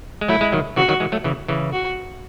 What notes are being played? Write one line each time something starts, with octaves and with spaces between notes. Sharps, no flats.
G#3
F#3 A3 E4
G#3
D#3 F#3
C#3 E3 F#4
D#3 F#3
E3 G#3
F#3 A3
C#3 E3
C#3 E3
F#4